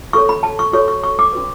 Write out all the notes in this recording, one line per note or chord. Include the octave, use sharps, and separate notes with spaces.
F#4 A4 C#5 C#6
B5
A5
C#6
F#4 A4 C#5 C#6
C#6
C#6
D6
D4 F#4 B4